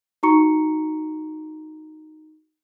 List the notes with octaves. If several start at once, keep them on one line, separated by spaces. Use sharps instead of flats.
D#4 F#4 A#5 C#6 C#7